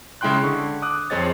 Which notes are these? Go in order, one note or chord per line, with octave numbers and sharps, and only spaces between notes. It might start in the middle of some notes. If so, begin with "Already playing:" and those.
C#3 G#3 E4 G5 C6 F#6
D3 C#6
D6 D#6 F#6
F2 C4 G#4 C#5 D#5 A6